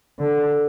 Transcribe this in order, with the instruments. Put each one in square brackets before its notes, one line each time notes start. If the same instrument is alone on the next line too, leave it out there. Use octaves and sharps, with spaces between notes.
[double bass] D3